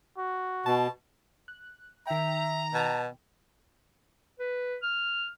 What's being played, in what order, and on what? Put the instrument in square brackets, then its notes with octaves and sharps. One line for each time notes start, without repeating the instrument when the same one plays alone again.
[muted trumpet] F#4
[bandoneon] B2 [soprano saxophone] A5
[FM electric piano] F#6
[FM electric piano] D#3 G5 [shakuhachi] E5 [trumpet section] A#5
[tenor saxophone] B2 [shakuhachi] A5
[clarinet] B4
F6